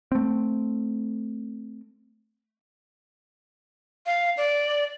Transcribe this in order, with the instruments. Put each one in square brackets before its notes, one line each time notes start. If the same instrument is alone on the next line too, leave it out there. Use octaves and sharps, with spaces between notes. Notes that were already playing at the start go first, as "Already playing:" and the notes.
[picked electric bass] A3 C4
[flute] F5
D5